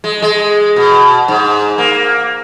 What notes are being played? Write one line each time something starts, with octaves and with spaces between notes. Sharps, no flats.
G#3
G#3
B2
G#2
A#3